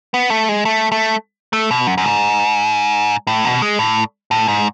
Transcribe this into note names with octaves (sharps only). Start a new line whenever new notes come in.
B3
A3
G#3
A3
A3
A3
B2
F#2
F#2
G#2
A2
B2
G#3
A2
A2
G#2